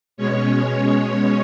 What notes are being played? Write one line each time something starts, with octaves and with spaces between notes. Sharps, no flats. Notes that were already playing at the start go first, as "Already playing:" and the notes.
B2 G#3 C#4 C#5